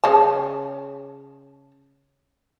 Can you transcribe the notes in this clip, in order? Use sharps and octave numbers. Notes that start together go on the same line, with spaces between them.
C#3 C#4 A5